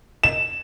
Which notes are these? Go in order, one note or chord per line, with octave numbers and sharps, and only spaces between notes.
E7